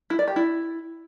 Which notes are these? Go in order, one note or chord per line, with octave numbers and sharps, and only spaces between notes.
E4
D5
G4
E4